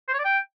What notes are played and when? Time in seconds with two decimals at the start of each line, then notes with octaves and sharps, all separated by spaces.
0.08 C5
0.14 C#5
0.19 D5
0.24 G5